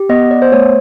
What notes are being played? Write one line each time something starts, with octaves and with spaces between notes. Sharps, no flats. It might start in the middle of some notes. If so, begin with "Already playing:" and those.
Already playing: G4
B3 D#5
D5
C5
A3 C#5